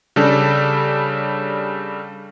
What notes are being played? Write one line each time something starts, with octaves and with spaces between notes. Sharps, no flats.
C#3 G3 D4 A4